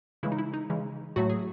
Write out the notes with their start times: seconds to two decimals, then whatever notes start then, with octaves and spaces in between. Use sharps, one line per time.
0.23 C#3 E3 G#3 E4
0.32 D#4
0.38 E4
0.53 D#4
0.70 C#3 E3 G#3
1.16 A2 F#3 A3 F#4
1.30 G#4